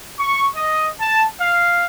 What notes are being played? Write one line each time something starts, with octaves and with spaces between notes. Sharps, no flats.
C#6
D#5
A5
F5